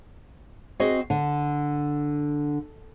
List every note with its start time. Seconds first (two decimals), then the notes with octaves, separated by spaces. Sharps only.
0.80 C4 F#4 G#4 D#5
1.10 D3